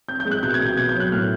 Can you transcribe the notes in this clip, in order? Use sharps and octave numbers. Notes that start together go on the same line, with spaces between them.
C4 G6
G6
G#3
F#6
B2 G6
G#6
B2
G6
B3 G#6
G6
F#3
F#6
A2 F6